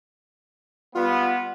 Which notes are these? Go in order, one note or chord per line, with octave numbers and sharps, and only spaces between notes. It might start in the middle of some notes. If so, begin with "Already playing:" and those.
G3 B3 F4